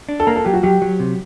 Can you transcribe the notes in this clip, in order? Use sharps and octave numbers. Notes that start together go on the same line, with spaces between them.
D4
A4
A#3 A#4
A4
F#3 G4
F#4
F#3 G4
F#3
C3